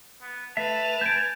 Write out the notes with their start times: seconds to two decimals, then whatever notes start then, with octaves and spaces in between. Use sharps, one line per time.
0.21 B3
0.57 A3 B4 E5 A5 F7
1.01 G#5 G6 D7